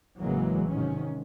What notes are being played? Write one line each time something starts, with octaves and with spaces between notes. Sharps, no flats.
A1 C#3 E3 F#3 G#3 A#3
G#2 C3 D#3 G#3 C#4